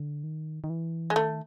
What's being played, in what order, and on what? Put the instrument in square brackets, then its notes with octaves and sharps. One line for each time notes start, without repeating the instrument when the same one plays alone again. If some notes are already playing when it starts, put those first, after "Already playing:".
Already playing: [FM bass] D3
D#3
D#3
E3
[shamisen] G#3
[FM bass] D#3 [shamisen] A3